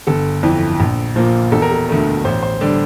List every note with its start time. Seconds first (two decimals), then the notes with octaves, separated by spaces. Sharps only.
0.07 G1 A4
0.43 F2 E3
0.80 A#1
1.16 A#2 F3 A#3
1.52 E1 A4
1.62 A#4
1.71 A4
1.89 D2 D3 A3
2.25 A1 C5
2.43 C5
2.61 D3 G3 D5